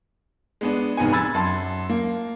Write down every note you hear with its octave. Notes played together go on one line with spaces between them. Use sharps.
G#3 B3 D4
F1 G#2 B3 G#5
B5 E6 G#6 A6
F#2 A5 C6
A#3